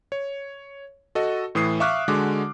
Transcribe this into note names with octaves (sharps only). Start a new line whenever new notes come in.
C#5
F#4 A4 D#5
A2 E3 D#6 C7
E5 F5 C#6 D6 F6 F#6
D3 G#3 F#4 D6